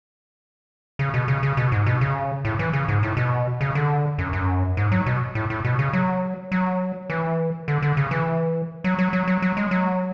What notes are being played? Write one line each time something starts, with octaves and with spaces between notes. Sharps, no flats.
C#3
B2
C#3
C#3
B2
G#2
B2
C#3
A2
E3
C#3
G#2
A2
B2
C#3
D3
F#2
F#2
G#2
F#3
B2
A2
A2
B2
C#3
F#3
F#3
E3
D3
D3
C#3
E3
F#3
F#3
F#3
F#3
F#3
G#3
F#3